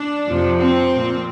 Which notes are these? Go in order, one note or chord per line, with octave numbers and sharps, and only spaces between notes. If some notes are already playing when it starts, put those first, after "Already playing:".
Already playing: D4
F2 C3 F3
C4
A#2 F3